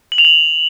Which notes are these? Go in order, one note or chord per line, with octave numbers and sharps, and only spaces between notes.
F#7
F7
F#7